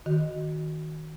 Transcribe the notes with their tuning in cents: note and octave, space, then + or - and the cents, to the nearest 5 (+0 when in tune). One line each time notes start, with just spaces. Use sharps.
D#3 +0 F#4 +0